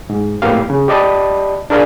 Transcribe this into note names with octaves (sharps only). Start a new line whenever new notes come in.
G#2
F#2 A2 A#3 B3 G4 F5
C#3
G4 D5 D#5 A5 B5
D4 G#4 A#4 D5 F5 G#5